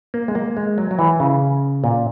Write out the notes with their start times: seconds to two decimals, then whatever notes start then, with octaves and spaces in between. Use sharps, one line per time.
0.14 A#3
0.28 G#3
0.35 A#3
0.57 G#3
0.78 F#3
0.91 F#3
0.99 E3
1.20 C#3
1.84 A#2